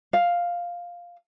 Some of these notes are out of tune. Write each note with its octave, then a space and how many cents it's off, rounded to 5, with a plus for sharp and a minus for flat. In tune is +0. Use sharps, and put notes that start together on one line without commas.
F5 +5